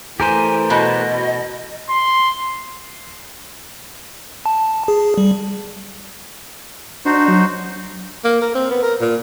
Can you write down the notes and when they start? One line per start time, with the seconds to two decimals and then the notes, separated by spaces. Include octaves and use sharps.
0.20 E3 A3 G4 A#4 C5 G#5
0.70 B2 D#5
1.90 C6
4.46 A5
4.88 G#4
5.18 G3
7.05 D4 D#4 F#4 C5
7.28 F#3
8.24 A#3
8.42 A#4
8.55 C4
8.71 B3
8.83 A#4
9.01 A#2